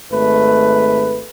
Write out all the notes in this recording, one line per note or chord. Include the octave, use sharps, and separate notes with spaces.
G#1 A3 B4